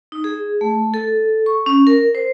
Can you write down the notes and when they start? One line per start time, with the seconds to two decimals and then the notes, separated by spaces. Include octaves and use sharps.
0.12 D#4
0.24 G#4
0.61 A3
0.94 A4
1.46 C#6
1.66 C#4
1.87 A#4
2.15 C5